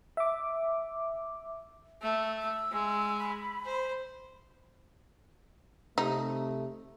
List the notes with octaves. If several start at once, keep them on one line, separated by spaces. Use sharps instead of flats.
E5 D6
A3 E6
E6
G#3
B5
C5
C3 A3 D#4